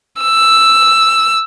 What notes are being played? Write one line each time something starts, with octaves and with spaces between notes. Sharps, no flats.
E6